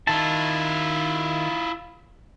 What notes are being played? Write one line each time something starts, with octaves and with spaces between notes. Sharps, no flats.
D#3 E4 F4 A5